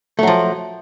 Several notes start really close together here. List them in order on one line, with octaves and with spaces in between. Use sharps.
A3 F#3 F3